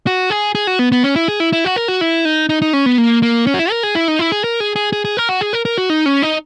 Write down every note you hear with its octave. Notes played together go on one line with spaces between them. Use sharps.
F#4
G#4
G#4
F#4
B3
B3
C#4
E4
G#4
E4
E4
F#4
A#4
F#4
E4
D#4
D#4
D#4
C#4
B3
A#3
A#3
C#4
F#4
E4
A#4
G#4
E4
D#4
E4
G#4
A#4
G#4
G#4
G#4
G#4
A#4
F#4
G#4
A#4
A#4
F#4
D#4
C#4
D#4